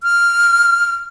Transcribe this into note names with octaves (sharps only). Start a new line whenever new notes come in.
F6